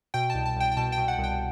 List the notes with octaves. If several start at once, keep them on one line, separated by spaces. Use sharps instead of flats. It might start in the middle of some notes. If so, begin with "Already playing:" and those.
B2 G5
C2 A5
A5
C2 G5
G5
B2 A5
G5
B2
F#5
C2
G5